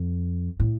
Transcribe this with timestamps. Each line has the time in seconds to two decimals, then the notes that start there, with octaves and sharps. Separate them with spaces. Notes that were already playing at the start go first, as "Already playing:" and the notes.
Already playing: F2
0.60 A2